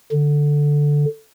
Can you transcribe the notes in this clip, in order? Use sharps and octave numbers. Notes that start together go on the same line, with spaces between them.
D3